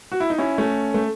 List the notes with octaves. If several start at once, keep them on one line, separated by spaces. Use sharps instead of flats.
F#4
E4
D#4
C#4 E4
A3 C#4
A3